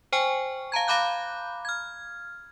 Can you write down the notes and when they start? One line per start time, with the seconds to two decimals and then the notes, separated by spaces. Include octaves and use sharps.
0.12 C5 G5 G#5 C#6
0.72 F5 A5 A#5 G#6
0.88 F5 A#5 B5 D6 F#6 G6
1.65 F6 G#6